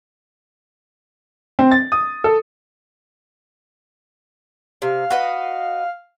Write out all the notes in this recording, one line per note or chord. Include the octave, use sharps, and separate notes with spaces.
C4
A6
D#6
A4
C3 F5
F#4 B4 D#5